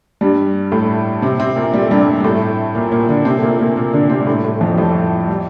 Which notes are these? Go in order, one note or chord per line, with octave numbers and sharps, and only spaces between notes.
G2 G3
A2 A3
C3 C4
C3 C4
A#2 A#3
G3
A3
G2 G3
G3
A2 A3
A#2 A#3
A#2 A#3
D3 D4
C3 C4
A3
A#2 A#3
A#2 A#3
A#2 A#3
D3 D4
C3 C4
G3
A2 A3
A2 A3
F2 F3
G3
A2 A3
G3